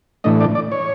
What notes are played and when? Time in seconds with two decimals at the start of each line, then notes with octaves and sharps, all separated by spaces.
0.24 A2 E3 A3 D4 D#5
0.40 D5
0.55 D5
0.72 C#5